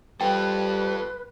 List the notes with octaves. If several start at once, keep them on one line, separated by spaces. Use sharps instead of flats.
G3 F4 A4 B4 G5